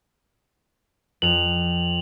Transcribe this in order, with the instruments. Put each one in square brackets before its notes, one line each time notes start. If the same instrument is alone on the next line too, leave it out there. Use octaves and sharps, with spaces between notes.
[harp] F2 [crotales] F7 F#7